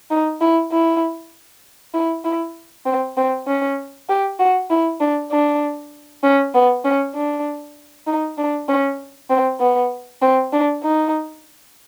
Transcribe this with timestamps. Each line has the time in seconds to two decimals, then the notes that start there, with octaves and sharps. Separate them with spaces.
0.10 D#4
0.41 E4
0.72 E4
1.94 E4
2.25 E4
2.86 C4
3.17 C4
3.47 C#4
4.09 G4
4.39 F#4
4.70 E4
5.00 D4
5.31 D4
6.23 C#4
6.54 B3
6.85 C#4
7.15 D4
8.07 D#4
8.38 D4
8.69 C#4
9.30 C4
9.60 B3
10.22 C4
10.53 D4
10.83 D#4